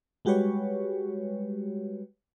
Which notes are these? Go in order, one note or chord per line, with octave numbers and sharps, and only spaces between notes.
G3 G#3 F#4 G4 B4 C#5